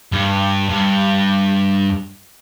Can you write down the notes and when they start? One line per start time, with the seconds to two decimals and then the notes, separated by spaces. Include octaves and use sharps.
0.12 G2
0.70 G2